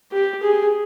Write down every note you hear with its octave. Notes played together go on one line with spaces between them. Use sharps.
G4
G#4